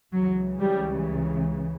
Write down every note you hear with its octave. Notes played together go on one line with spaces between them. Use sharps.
C#2 C#3 E3 F#3
G3